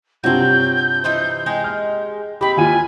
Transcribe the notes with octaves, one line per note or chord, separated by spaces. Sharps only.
G2 C3 F#3 C4 F4 G6
E3 D#4 C5
G#3 D#4 G4
F6
C4 D#4 G4 B5
D#2 F4 G#5 D#7